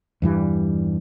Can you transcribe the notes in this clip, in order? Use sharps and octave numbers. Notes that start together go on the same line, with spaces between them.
E2 G2 E3 G3